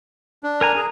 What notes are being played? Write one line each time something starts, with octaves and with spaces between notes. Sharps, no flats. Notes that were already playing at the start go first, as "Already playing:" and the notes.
D4
A#4 G#5 A#5
G#4